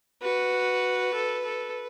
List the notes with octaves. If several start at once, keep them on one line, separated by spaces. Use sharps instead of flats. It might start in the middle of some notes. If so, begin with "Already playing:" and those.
F#4 B4
A4
A4